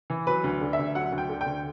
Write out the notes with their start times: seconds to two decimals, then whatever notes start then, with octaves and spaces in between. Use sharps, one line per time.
0.10 E3
0.27 F#3 B4
0.44 D2
0.61 D3
0.73 E5
0.79 D2
0.95 F#3 F#5
1.12 D2
1.18 G5
1.29 D3
1.41 G5
1.46 D2